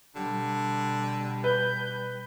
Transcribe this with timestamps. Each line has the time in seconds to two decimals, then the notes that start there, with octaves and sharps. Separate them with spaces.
0.16 B2 D3 G3
1.44 B4 G6